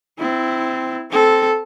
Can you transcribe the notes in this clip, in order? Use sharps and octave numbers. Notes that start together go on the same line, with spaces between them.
C4 E4
C4 A4